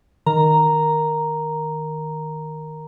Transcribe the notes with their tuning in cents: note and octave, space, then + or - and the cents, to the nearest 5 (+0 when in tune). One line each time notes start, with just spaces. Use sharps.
D#3 -5 A#4 +0 A#5 +0